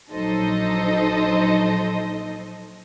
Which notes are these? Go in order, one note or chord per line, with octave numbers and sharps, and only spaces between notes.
A#1 F#3 D#4 A4 C5 D#5